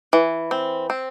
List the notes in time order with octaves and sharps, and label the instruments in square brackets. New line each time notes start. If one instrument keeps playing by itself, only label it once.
[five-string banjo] E3
C4
C4